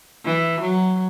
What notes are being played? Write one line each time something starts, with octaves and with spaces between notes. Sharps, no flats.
E3
F#3